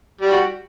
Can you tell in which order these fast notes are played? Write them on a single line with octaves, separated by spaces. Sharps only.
G3 G4 F#4